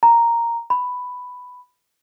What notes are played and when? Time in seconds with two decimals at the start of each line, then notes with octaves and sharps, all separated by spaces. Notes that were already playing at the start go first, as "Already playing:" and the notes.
0.03 A#5
0.70 B5